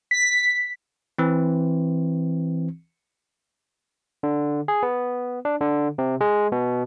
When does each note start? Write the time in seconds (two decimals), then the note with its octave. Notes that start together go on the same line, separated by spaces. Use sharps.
0.11 B6
1.18 E3 C4
4.23 D3
4.68 G#4
4.83 B3
5.45 D4
5.61 D3
5.98 C3
6.21 G#3
6.52 B2